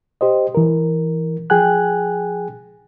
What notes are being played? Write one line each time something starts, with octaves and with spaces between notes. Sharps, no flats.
G4 C5 D#5
E3 A#4
F3 G#4 G5 G#5 F#6